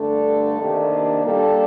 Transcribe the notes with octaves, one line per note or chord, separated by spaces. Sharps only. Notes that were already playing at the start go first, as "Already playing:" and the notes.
Already playing: G2 D3 A3 D4 A4
C3 D#3 A#3 D4
A#2 G3 A#3 D4 A4